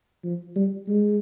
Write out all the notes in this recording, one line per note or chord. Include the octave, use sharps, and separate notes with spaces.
F3
G3
G#3